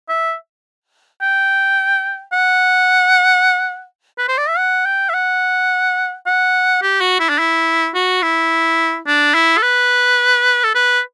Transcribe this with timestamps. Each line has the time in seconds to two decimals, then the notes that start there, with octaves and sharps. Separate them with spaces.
0.09 E5
1.22 G5
2.33 F#5
4.18 B4
4.28 C5
4.38 D5
4.48 E5
4.57 F#5
4.86 G5
5.09 E5
5.14 F#5
6.27 F#5
6.82 G4
7.00 F#4
7.20 E4
7.29 D4
7.39 E4
7.94 F#4
8.22 E4
9.07 D4
9.34 E4
9.58 A4
9.62 B4
10.64 A4
10.75 B4